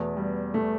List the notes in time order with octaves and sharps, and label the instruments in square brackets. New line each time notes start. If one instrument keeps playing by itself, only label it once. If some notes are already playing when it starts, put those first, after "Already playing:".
Already playing: [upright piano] E2 B2 A3 [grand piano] B3
[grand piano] G3
A3